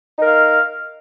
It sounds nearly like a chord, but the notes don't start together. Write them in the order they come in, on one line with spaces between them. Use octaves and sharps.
D#4 A#4 F5